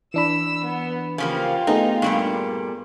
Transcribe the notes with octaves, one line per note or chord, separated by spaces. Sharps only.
E3 D4 B5 E6
B3
C#3 F3 A#3 F4 G4
A3 B3 D#4 G#4
G2 A#2 G3